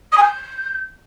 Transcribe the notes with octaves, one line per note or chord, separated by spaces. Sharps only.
D#6
G#5
G6